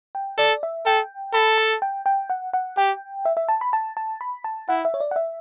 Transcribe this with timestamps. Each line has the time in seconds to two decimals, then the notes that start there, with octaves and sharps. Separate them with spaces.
0.15 G5
0.38 A4 D5
0.63 E5
0.86 A4 G5
1.33 A4 B5
1.58 A5
1.82 G5
2.06 G5
2.30 F#5
2.53 F#5
2.77 G4 G5
3.25 E5
3.37 E5
3.48 A5
3.61 B5
3.73 A5
3.97 A5
4.21 B5
4.44 A5
4.69 E4 F#5
4.85 E5
4.94 C#5
5.00 D5
5.11 F#5
5.16 E5